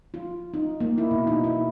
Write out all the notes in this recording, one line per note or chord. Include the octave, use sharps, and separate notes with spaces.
F4
D#4
A#3
E4
B2
D#4
E4